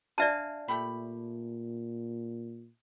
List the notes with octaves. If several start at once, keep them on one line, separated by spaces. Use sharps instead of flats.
D4 D5 E5 F5 G#5 A5
A#2 A3 G4 B5